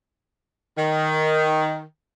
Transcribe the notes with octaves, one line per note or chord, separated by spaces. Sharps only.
D#3